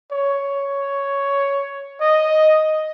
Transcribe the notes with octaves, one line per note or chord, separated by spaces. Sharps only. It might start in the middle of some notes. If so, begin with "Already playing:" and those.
C#5
D#5